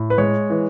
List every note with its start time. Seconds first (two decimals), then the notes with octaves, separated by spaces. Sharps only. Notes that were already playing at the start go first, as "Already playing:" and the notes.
Already playing: A2
0.10 B4
0.18 G#3 C#5
0.50 E3